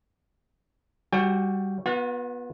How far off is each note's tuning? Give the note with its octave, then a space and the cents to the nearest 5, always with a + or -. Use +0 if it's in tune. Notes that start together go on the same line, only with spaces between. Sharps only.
G3 +0 F#4 +0 G5 +35
B3 -15 F4 +45 F#5 -40